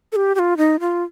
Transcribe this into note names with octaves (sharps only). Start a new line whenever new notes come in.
A4
G4
G4
F4
D#4
F4